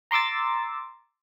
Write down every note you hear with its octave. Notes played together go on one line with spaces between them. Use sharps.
A#5 C6 D6 E6 A6